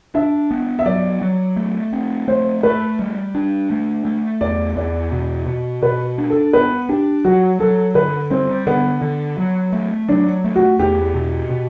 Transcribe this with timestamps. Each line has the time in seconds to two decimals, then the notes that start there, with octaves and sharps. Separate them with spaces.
0.15 D4 E5
0.51 B3
0.79 E5
0.85 F#3 D5
1.21 F#3
1.56 A3
1.93 C4
2.28 A3 C5
2.63 A3 B4
2.99 G3
3.35 D4
3.70 A3
4.05 A3
4.41 E2 D5
4.76 E2 D5
5.12 B2
5.47 B2
5.82 B2 B4
6.18 D4
6.30 A4
6.53 B3 B4
6.89 D4 G4
7.25 F#3 F#4
7.60 F#3 A4
7.95 D3 B4
8.30 G3 C4
8.67 D3 B3
9.02 D3
9.38 F#3
9.73 A3
10.08 F#3 D4
10.44 A3
10.56 F#4
10.79 E2 G4
11.14 B2
11.50 B2